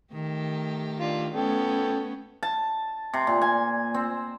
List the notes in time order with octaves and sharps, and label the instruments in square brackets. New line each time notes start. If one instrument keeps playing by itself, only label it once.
[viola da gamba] D#3 A3 G4
[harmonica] D4 F4
[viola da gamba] A3 B3 C#4 [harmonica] A4 G5
[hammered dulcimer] A5
C3
A#2
G#5
C4